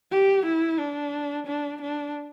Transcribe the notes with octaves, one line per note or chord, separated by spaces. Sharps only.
G4
E4
D4
D4
D4